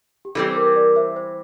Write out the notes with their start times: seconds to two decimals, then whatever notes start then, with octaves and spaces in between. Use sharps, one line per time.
0.25 G4
0.35 E3 G3 C4 A4
0.49 C5
0.56 A#4
0.76 A#4 D5
0.96 C5 E5
1.16 C5